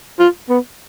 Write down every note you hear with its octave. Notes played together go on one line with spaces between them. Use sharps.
F4
B3